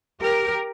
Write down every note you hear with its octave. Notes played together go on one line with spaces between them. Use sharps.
G4 A#4